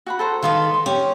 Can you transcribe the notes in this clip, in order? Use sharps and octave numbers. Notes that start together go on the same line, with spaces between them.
F#4 F#5 B5
A4 C5 A#5
D#3 A4 B4 F5 C6 D#6
C6
C#4 G4